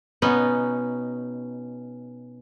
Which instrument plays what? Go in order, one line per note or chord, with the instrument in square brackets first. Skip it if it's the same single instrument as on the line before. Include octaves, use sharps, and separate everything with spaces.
[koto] B2 B3 C#4 D#4